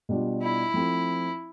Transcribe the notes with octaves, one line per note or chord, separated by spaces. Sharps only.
B2 G3 D4 F4
E4
F3 A3 C4 F4